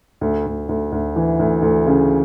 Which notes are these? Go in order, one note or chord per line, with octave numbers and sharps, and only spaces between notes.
D2
D2
D2
D2
E3
D2
D2
C#3